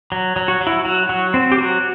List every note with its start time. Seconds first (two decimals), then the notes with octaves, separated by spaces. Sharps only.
0.12 F#3
0.36 F#3
0.48 F#4
0.61 F#3
0.67 E4
0.85 F#3 F#4
1.09 F#3 F#4
1.34 C4
1.52 G4
1.58 F#3 F#4